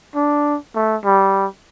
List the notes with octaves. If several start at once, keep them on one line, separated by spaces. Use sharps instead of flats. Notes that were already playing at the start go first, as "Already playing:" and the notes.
D4
A3
G3